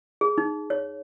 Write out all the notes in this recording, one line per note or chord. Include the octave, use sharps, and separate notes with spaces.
G#4
D#4
C#5